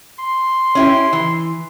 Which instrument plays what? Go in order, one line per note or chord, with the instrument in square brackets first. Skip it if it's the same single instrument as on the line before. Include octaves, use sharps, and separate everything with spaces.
[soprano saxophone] C6
[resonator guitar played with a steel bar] C#4 E4 G4
E3